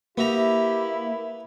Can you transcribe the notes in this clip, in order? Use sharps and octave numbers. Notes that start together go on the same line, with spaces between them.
A#3 B3 E4 G4 E5 A#5